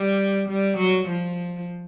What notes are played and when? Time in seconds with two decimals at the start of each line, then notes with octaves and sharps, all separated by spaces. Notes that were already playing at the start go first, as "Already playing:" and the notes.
Already playing: G3
0.48 G3
0.77 F#3
1.08 F3